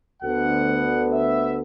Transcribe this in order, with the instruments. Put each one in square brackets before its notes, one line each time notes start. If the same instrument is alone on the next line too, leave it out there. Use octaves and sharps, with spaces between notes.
[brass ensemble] D2 D3 B3 F#5
E5